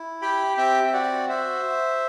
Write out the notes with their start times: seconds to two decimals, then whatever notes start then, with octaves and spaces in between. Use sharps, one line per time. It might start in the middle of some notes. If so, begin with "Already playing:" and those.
Already playing: E4
0.21 G4 G5 B5
0.57 C4 E5 G5
0.87 E5
0.93 F#4 D5 F#5
1.29 F#4 C5 E5